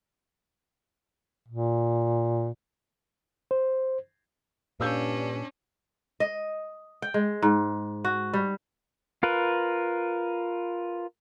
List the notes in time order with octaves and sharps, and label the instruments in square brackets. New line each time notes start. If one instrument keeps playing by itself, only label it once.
[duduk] A#2
[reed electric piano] C5
[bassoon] G2 [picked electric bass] A#2 [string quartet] C#4 D4 [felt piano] F5 E6 G6
[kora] D#5
G5
G#3
G#2
F#4
G3
[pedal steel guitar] F4 A#4 B4